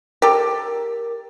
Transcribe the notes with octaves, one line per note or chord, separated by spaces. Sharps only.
G4 A4 A#4